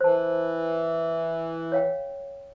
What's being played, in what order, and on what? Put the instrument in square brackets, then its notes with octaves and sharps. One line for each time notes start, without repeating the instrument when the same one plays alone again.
[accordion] E3 [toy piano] C5 A5
[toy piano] C#5 F5 G5